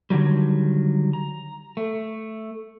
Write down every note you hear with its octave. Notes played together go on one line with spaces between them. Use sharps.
D3 D#3 F#3 G3
A#5
A3